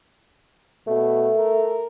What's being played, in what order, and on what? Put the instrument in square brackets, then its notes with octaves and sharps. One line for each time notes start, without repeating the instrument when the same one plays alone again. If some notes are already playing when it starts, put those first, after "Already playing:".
[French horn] B2 [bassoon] A3
[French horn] A#4